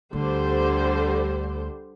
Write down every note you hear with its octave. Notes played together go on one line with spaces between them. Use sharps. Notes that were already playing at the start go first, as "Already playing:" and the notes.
D2 D3 G3 C5